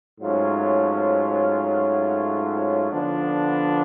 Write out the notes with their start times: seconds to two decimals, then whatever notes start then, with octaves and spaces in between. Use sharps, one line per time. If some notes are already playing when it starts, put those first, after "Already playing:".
0.20 G#2 F#3 A3 C#4 F4
2.91 D3 F3 B3 D4